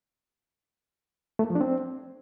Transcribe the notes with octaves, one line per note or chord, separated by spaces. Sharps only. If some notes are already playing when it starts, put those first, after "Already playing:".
A3
A#3
F3
D4
C4